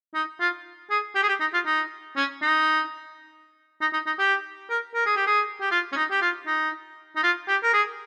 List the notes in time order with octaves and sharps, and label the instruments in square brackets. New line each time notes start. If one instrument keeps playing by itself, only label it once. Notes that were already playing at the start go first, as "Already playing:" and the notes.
[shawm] D#4
F4
G#4
G4
G#4
G4
D#4
F4
D#4
C#4
D#4
D#4
D#4
D#4
G4
A#4
A#4
G#4
G4
G#4
G4
F4
C#4
D#4
G4
F4
D#4
D#4
F4
G4
A#4
G#4